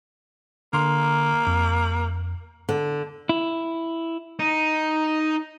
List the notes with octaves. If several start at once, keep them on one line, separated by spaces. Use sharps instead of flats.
D3 A#3 C6
F2
D3
E4
D#4